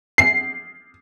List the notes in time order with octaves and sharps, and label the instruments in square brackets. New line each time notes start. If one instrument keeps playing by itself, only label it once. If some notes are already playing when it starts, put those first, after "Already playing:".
[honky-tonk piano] C7